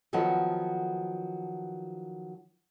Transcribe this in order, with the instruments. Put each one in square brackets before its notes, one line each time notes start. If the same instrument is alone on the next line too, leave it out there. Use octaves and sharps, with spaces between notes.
[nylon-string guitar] D#3 F3 F#3 B3 A4 F#5